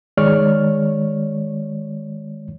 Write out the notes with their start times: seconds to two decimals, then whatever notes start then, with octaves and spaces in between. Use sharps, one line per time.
0.17 D#3 G#3 C#5 D5 C#6 F6